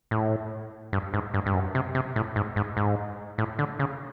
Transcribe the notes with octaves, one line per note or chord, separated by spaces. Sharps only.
A2
G2
G#2
G2
G2
F#2
C3
C3
A2
G#2
G#2
G#2
A2
D3
C#3